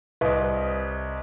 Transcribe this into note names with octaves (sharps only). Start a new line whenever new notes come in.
C2 B4 D#5